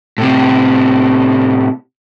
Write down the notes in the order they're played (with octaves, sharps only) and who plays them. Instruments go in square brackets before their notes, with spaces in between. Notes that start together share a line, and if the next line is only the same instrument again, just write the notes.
[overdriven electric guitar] A2 C3